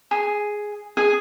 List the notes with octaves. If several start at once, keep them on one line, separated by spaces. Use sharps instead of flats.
G#4
G#4